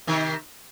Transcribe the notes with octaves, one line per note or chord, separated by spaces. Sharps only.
C3 D#3